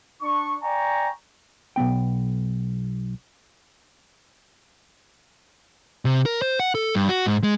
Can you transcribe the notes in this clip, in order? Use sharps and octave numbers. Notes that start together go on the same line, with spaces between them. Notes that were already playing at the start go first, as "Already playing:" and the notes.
D4 C#6
D5 G5 G#5 A#5 C#6
B1 B2 B3 G5
C3
A#4
C5
F#5
A4
G2
F#4
G#2
G#3